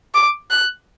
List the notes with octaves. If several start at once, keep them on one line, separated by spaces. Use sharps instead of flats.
D6
F#6